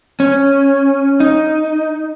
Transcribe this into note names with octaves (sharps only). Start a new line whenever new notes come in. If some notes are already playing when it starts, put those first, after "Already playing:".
C#4
D#4